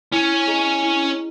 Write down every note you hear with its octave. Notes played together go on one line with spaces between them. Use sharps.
C#4 E4
G#4 D#5 A#5
E4